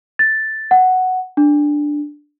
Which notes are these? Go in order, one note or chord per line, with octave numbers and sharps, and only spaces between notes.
A6
F#5
D4